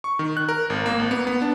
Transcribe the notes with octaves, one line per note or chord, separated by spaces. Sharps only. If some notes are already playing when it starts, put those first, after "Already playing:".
C#6
D#3
F#6
A#4
G#1
A#3
G#1
B3
B3
D4